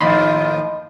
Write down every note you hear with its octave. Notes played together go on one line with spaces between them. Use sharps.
D#2 A2 F3 D#5 B5 C6